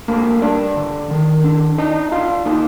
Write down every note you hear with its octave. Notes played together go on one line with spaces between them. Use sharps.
D3 A#3 A#4
G3 D4 D5
D3
D#3
D4
D4 D#4 D#5
D4 F4 F5
A#3 D#4 D#5